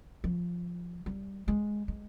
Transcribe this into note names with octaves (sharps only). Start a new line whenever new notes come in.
F3
G3
G#3
G#3